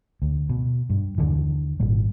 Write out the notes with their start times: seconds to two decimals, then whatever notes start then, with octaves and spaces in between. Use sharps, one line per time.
0.22 D2
0.50 B2
0.90 G2
1.18 D#2 D3 E3
1.80 G#1 A#2 G3